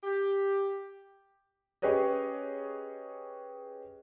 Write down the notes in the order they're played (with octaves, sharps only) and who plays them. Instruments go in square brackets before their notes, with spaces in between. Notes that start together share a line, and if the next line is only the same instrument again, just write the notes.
[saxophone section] G4
[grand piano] C#4 G4 G#4 B4 C#5 D#5